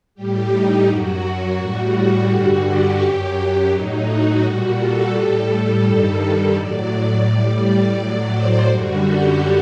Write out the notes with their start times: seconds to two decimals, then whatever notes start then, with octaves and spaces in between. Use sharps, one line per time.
0.15 A2 G3 G4
0.51 D#4
0.86 F#2 F#3 F#4
1.57 A2 G3 F#4
1.93 F#4
2.28 G2 D3 G3 F#4
2.63 G4
2.99 F#2 F#3
3.70 A2 F#3 D#4
4.06 F#4
4.41 A#2 G3 F#4
4.77 A4
5.11 A2 G3 A4
5.47 A4
5.82 G2 D#3 G3
6.53 A2 F#3 D5
6.89 D5
7.24 A2 G3
7.60 D5
7.95 A2 F#3
8.31 C5
8.67 F#2 D3 G3 F#4
9.02 G4